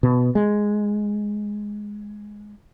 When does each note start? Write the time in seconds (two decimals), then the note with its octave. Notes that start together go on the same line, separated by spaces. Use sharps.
0.03 B2
0.35 G#3